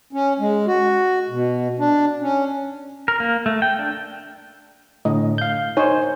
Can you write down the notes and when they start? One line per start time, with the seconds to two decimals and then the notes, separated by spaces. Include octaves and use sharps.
0.13 C#4
0.39 G#3
0.67 F#4
1.29 B2
1.79 D4
2.22 C#4
3.08 A#4
3.20 A#3
3.46 A3
3.62 G5
3.79 D4
5.05 A2 D3 D#5
5.38 F5 G6
5.77 D#4 C5 C#5 G#5